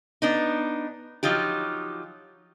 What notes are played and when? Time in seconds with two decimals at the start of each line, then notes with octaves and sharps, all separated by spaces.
0.22 B3 D4 D#4
1.23 F3 F#3 D#4 F4 G4